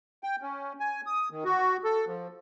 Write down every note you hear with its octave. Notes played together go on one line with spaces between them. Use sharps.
G5
C#4
G#5
D#6
D#3
F#4
A4
F3